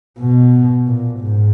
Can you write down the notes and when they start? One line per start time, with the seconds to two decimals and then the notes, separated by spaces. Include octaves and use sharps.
0.20 B2
0.87 A#2
1.21 G#2